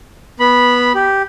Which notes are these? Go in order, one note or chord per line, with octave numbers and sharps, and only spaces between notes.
B3 B5
G4